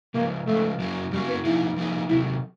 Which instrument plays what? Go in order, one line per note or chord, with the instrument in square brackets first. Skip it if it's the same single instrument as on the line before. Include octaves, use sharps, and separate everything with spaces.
[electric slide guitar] C#3 F3 G#3 [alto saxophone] A#3
[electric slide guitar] C#3 F3 G#3 [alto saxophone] A3
[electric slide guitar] F#2 C#3 F#3 A#3
[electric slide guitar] F#2 C#3 F#3 A#3 [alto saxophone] G3
[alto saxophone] B3
[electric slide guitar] F3 A#3 D#4 G#4 [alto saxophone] E4
[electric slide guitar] F3 A#3 D#4 G#4
[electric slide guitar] C3 D#3 F#3 [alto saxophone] E4